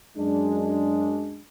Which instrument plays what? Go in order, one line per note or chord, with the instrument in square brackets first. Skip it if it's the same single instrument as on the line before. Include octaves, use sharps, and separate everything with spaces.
[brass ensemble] F#2 G#3 D4